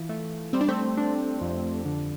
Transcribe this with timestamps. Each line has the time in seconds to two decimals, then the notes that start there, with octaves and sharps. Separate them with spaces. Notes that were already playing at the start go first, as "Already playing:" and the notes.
Already playing: E3 F4
0.09 A3
0.53 G3 C4
0.61 D4
0.68 A3 C4
0.97 D4
1.41 F2
1.85 D3